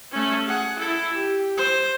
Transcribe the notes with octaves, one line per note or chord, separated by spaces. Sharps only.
A3 C#4
G#4 F#5
E4 A4
G4
C5